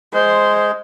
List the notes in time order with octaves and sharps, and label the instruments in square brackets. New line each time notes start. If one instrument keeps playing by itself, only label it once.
[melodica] G#3 [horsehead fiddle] C5